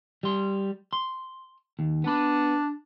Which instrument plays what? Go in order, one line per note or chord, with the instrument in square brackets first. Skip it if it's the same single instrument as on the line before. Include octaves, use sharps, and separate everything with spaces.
[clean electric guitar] G3 C6
C6
D#2
[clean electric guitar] B3 B5 [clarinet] D4